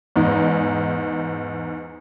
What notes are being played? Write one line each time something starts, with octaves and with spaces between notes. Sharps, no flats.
E2 G#2 D#4